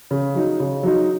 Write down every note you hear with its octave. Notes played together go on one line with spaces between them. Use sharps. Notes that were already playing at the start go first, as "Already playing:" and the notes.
C#3
F#3 D#4
C#3
F#3 D#4